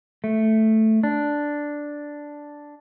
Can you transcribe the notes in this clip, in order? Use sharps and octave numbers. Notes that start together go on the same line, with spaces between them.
A3
D4